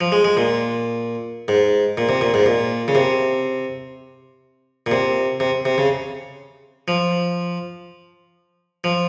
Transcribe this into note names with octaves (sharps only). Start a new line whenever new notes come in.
F3
G#3
G#3
A#2
G#2
A#2
C3
A#2
G#2
A#2
C#3
C3
A#2
C3
C3
C3
C#3
F3
F3